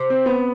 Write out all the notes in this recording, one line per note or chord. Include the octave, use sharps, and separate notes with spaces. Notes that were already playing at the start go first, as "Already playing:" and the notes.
Already playing: C3
C4
B3